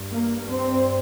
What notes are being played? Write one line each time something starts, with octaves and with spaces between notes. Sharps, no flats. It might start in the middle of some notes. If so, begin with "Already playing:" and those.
Already playing: G2
A#3
C4